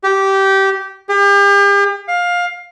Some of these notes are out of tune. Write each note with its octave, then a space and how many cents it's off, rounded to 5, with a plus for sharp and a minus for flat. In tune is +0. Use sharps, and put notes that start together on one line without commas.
G4 -15
G4 +40
F5 +15